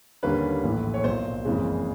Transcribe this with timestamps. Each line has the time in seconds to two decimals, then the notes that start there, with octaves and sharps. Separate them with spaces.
0.23 D#2 D3 G3 A#3 C#4 B4
0.63 A#1 A2 E3
0.94 C#5
1.03 B1 A#2 F#3 C5
1.45 F#1 F2 C#3 E3 G#3